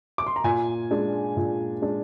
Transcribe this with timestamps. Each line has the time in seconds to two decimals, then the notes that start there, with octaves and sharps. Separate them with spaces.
0.18 D6
0.27 C6
0.36 A#5
0.44 A#2 G#5
0.91 G#3 D4
1.37 A#2
1.82 G#3 D4